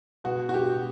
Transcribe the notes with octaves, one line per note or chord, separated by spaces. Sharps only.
B2 F#4
F#4
G4